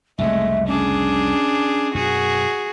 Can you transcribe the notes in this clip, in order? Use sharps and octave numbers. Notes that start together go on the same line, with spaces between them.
C2 F2 C#3 G#3 A3 E5
C#4 D4 G#4
F#2 B2 F#4 G#4